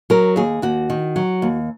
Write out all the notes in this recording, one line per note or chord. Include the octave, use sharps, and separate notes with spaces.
F#3 A#4
D#2 G#4
D#2 F#4
D#3
F#3
D#2